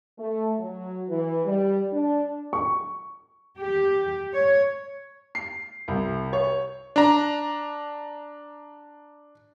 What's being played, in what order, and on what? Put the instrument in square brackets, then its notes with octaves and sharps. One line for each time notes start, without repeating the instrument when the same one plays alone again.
[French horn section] A3
F#3
E3
G3
D4
[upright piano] C#6
[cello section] G4
C#5
[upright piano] C7
C2
C#5
[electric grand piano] D4 A#5